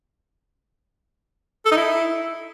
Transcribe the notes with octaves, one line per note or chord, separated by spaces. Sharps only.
A4
D#4
E4